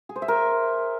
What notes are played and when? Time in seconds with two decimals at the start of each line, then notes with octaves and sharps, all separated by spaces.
0.09 G#4
0.16 C5
0.22 E5
0.28 A#4